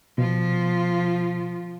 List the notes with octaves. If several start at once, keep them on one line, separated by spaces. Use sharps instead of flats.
B2 F3 F4